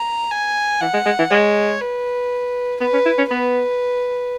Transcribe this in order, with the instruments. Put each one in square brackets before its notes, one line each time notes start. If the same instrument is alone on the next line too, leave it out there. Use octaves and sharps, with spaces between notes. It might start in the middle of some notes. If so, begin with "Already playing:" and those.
Already playing: [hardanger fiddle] A#5
G#5
[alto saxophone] E3 [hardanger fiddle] F#5
[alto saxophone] G#3
G#3
E3
[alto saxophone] G#3 [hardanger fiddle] C#5
[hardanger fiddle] B4
[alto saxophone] B3 [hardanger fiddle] B4
[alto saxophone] C#4
E4
C#4
[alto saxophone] B3 [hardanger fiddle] B4